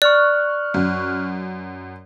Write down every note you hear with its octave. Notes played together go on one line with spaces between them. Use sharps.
D5 C#6 F6 F#6
F#2